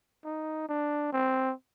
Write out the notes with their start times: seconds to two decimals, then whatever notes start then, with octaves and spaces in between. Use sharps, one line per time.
0.24 D#4
0.69 D4
1.13 C4